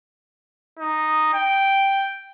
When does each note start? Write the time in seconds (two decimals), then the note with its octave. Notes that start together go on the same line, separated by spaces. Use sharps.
0.79 D#4
1.33 G5